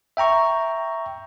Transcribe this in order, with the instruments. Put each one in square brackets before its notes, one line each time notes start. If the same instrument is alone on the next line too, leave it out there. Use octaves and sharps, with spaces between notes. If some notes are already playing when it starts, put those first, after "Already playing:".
[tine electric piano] E5 G5 A#5 C#6